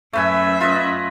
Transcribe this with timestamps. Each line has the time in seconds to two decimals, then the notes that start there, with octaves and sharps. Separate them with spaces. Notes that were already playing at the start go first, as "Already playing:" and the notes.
0.13 F#2 A3 B4 E5 G#5
0.61 F4 B4 D#5